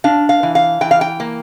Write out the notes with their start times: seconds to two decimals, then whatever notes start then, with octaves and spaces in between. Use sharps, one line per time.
0.04 D4 F5
0.29 F5
0.43 E3
0.55 F5
0.81 E3 G5
0.91 F5
1.01 G5
1.20 A#3